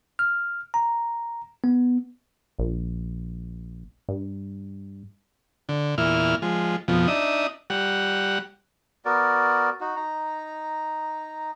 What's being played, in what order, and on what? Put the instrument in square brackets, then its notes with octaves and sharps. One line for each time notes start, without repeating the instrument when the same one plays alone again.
[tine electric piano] F6
A#5
B3
[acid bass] A#1
G2
[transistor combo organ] D3
E2 A#2 E4 F6
F3 G#3
F2 B2 F3
D4 D#4 E5 D#6
G3 F#5
[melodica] B3 F#4 A#4 D5
D#4 F#4
D#4 A#5